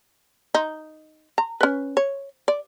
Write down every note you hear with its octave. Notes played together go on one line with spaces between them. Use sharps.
D#4
A#5
C#4 B4
C#5
D5